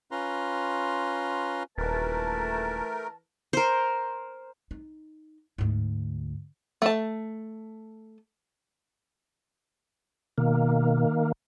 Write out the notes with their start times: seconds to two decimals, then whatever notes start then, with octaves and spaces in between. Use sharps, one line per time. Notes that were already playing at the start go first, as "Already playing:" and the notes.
0.11 C#4 F4 B4 A#5 C6
1.78 D#1 E3 A3 A#4 B4 A5
3.53 A#4 C5
4.71 D#4
5.58 D2 G#2
6.82 A3 A5
10.38 B2 D#3 A#3